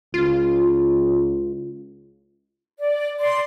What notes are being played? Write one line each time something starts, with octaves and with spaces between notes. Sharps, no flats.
C#2 F4
D5
D5 C6